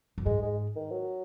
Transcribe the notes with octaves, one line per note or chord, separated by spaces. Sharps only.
F#2
G#2 G#3
G#3
D#3
F#3